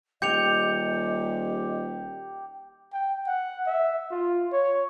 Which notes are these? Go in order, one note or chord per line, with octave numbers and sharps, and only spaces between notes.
D#1 G4 D#5 G6 C#7 F7
G5
F#5
E5
F4
C#5